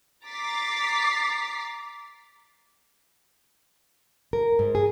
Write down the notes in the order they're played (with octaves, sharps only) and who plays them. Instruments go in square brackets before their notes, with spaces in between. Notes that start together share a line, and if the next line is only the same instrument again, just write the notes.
[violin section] A#5 D6 A6 B6 C7
[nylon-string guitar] A#4
G#2
G#4